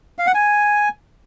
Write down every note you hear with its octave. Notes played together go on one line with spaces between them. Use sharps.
F5
F#5
G#5